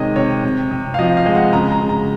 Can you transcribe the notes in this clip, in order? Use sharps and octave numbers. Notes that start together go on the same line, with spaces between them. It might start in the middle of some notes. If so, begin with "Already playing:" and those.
Already playing: C3 D#3 G#3 C#5 D#5
C3 C#5
C3
C3
F5
F3 D#5
F5
G#3
F#5
C#3 A#5
A#5
C#3
A#5